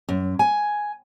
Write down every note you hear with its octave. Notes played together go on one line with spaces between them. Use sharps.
F#2
G#5